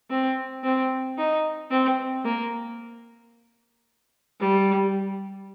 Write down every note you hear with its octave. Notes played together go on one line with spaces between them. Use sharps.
C4
C4
D#4
C4
A#3
G3